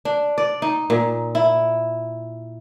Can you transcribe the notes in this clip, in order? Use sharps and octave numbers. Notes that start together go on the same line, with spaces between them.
D4
D5
D#4
A#2
E4